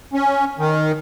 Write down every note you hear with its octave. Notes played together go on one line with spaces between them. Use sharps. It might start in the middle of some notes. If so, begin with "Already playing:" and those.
C#4
D#3